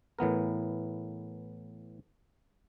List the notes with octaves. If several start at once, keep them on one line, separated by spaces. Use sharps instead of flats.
A2 E3 B3 A#4